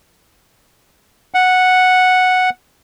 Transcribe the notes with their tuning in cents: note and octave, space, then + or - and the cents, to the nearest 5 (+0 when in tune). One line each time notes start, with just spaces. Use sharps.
F#5 -5